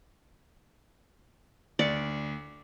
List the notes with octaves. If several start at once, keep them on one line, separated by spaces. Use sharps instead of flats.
D2 D5 C#7